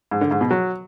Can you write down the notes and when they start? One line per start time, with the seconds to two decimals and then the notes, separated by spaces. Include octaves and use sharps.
0.11 G#2
0.21 D3
0.31 G#2
0.41 B2
0.51 F#3